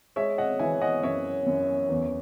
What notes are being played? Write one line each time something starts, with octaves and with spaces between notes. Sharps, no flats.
G#3 C#5 E5
D#5 F#5
E3 E5 G#5
D#5 F#5
F#2 C#5 E5
F#2
E2